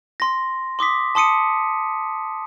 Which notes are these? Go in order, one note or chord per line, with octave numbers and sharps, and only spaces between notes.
C6 A#6
C6 D6 D#6 B6
A5 C6 D#6 C#7 D#7